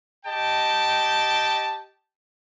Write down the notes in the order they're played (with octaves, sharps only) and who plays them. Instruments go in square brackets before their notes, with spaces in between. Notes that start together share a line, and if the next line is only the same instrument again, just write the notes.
[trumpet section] G4 D#5 G5 A5